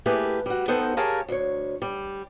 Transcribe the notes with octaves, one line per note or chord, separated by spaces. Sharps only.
A3 A#3 E4 G4 G#4 B4
G3 F#4
B3 D#4 A4 C5 G5
G4 G#4 A#4 C#5 F5 A5
D2 C#5
G3